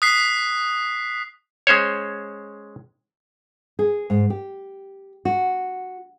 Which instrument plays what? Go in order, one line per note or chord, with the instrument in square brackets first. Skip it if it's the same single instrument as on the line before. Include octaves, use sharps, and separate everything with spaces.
[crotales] D#6 F#6 B6 C7
[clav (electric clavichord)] G#3 C#4 C5 C#5
[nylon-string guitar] G#4
G#2
G4
F#4